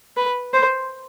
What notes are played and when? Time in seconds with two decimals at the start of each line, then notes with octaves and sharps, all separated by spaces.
0.17 B4
0.54 C5